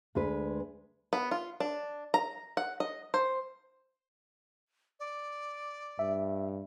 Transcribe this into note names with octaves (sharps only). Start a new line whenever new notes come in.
D2 G#3 B4
B3
F4
D4
A#5
F#5
D#5
C5
D5
G2 E5